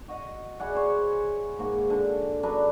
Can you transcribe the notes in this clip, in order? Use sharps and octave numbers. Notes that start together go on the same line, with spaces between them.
F#4 D#5 F#5
E4 G#4 D5 F#5
C5 C#5
G#2 A#3 F#4
D3
F#2 D4 B4 A#5